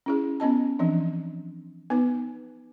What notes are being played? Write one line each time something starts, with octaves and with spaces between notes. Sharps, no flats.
C#4 E4 G#4
B3 C#4 D#5 A5
E3 F3 C4 D4
B3 D#4 B4